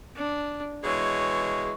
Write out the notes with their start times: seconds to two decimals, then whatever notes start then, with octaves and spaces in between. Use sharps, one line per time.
0.16 D4
0.84 B2 E3 G#3 C#5